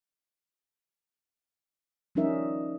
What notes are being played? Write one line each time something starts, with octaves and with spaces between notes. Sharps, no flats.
F3 G3 C#4 D#4 A#4 E5